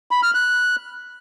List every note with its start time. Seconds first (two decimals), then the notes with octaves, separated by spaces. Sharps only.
0.11 B5
0.23 F6
0.35 F#6